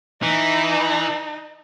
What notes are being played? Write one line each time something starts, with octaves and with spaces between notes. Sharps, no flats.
E3 D#4